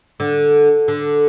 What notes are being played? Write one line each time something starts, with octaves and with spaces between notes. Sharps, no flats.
D3
D3